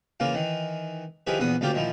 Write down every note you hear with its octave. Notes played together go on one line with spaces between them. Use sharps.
C#3 E3 A#3 F4
D#3 E3
D#3 F3 E4 G4 G#4 B4
A#1 E2 B3 F#5 D#6
D2 C#3 A3 A#3 F4 G4
A#2 D#3 F3 E4